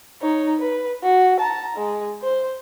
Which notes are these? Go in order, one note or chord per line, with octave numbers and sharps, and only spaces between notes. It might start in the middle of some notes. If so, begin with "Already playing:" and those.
D#4 C#5
B4
F#4
A5 A#5
G#3
C5